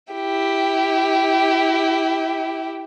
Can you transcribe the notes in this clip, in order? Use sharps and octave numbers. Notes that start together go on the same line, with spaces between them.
E4 G4